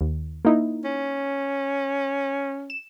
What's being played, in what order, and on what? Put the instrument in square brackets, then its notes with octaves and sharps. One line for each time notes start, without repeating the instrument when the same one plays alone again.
[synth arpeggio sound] D#2
A#3 D#4 E4
[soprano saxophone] C#4
[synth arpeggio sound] E7